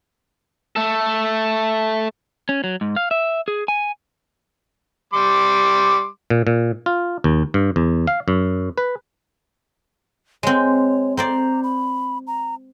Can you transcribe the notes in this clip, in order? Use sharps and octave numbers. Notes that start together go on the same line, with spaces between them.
A3 A4
C#4
F#3
G#2
F5
E5
G#4
G#5
G3 C6 D6
A#2
A#2
F4
D#2
G2
E2
F5
F#2
B4
G#3 C4 C#5
C4 C5 D5 A#5
B5
A#5